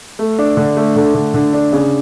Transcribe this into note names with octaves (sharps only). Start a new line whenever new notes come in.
A3
D4
D3
A3
D3
D3
D3
D4
C#3